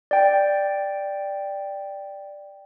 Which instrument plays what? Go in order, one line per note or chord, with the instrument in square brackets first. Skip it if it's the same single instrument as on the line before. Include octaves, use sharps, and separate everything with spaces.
[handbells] D5 G5